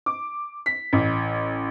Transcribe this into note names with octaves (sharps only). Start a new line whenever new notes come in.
D6
B6
A1